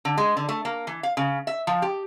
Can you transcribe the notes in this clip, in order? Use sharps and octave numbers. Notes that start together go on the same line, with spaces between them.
D3
G#3
D3
A3
A#3
E3
F5
C#3
E5
F3
G4